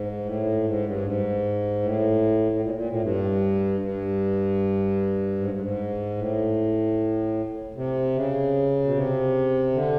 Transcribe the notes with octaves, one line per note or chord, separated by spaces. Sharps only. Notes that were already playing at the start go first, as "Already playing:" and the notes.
Already playing: G#2
A2
G#2
G2
G#2
A2
A2
A#2
A#2
A2
G2
G2
G#2
G2
G#2
A2
C3
C#3
B2
C3
D3